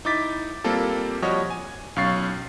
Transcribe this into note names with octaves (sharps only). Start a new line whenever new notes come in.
D#4 E4 D6 A6 B6
G3 A#3 C4 F4 A4
F3 G3 F#4 C#5 D#5
G#5
B1 C#4 F5 C#6 A6 C7